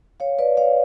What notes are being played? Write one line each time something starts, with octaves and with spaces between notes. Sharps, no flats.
C#5 F5
B4 D5
C#5 F5